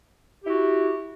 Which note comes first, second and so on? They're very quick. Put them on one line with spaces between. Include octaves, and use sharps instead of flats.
G4 E4 F#4